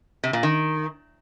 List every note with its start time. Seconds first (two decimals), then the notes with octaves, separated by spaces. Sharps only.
0.23 C3
0.33 A#2
0.43 D#3